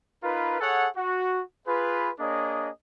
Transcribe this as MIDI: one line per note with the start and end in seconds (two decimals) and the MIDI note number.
0.23 0.59 63
0.23 0.59 65
0.23 0.59 70
0.23 0.59 71
0.60 0.88 68
0.60 0.88 69
0.60 0.88 73
0.60 0.88 78
0.97 1.41 66
1.67 2.10 65
1.67 2.10 68
1.67 2.10 71
2.19 2.69 58
2.19 2.69 62
2.19 2.69 68
2.19 2.69 73
2.19 2.69 75